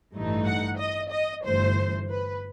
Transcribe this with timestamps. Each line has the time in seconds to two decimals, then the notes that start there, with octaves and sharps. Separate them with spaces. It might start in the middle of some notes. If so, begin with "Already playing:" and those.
0.13 A1 G2 E3 A3 D#4
0.46 F#5
0.78 D#5
1.11 D#5
1.44 G1 G2 E3 A3 C5
2.10 B4